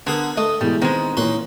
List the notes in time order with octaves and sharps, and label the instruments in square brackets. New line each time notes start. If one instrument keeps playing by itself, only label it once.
[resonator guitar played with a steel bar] D3 [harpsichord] B3 G#4 A#4
[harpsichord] A3 [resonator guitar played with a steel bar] D#5
[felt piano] B2 E3 G#3 [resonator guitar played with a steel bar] G3
[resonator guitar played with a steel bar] D#3 G#3 [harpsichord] B3 [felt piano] C4
[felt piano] A#2 E3 [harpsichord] C#4 B4 C6